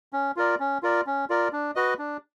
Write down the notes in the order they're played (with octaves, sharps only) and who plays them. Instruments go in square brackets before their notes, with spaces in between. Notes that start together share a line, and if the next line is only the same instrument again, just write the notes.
[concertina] C#4
F4 A#4 D5
C#4
F4 A#4 D5
C#4
F4 A#4 D5
D4
F#4 B4 D#5
D4